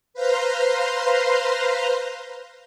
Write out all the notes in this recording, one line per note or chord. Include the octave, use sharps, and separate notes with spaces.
B4 C5 F5 A#5 C6